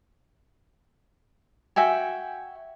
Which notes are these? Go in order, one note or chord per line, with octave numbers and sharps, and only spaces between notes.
F#4 E5 G5 G#5